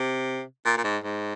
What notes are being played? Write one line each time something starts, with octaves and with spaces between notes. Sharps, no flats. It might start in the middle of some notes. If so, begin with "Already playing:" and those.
Already playing: C3
A#2
A#2
G#2
G#2